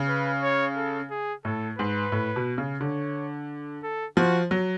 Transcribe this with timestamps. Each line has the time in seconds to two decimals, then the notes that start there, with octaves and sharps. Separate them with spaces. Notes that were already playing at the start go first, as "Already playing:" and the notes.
Already playing: C#3
0.08 B4
0.43 C#5
0.76 A4
1.10 G#4
1.45 A2 A4
1.78 G#2 B4
2.12 A2
2.36 B2
2.58 C#3
2.81 D3 C#5
3.83 A4
4.17 F3 F#4
4.51 F#3